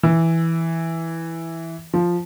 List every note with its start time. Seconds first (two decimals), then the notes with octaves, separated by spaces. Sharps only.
0.03 E3
1.94 F3